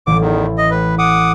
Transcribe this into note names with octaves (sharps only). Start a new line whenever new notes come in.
A1 E3 D6
E2 D#3
D#5
A2 B4
F#5 D6 D#6